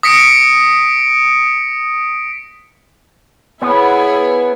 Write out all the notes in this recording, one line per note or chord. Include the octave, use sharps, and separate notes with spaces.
D#6 A#6 B6 C#7 D7
B3 E4 G#4 C#5